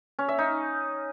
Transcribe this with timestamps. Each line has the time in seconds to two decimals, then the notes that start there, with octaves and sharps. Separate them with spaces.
0.19 C#4
0.28 E5
0.38 D#4